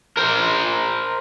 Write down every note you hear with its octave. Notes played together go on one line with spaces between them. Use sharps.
A#4 C5